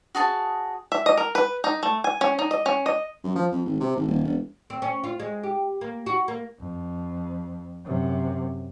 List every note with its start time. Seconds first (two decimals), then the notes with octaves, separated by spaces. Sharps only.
0.15 F#4 G#4 A5
0.92 E5
1.06 D#5
1.17 A#4
1.35 B4
1.64 D#4
1.83 A3
2.04 G#5
2.21 C#4
2.39 D#4
2.51 D#5
2.66 C#4
2.86 D#5
3.24 F#2
3.36 F3
3.52 F2
3.66 G#1
3.80 C3
3.96 G#1
4.08 D#1
4.25 E1
4.70 C4
4.82 C#4
5.04 F4
5.20 G#3
5.43 G4
5.81 A#3
6.06 F#4
6.28 A#3
6.60 F2
7.85 F#2 C3